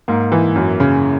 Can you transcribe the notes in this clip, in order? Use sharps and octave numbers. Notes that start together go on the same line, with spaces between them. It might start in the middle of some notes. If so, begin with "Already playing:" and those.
G#2 A#3
E3
F#2
C#3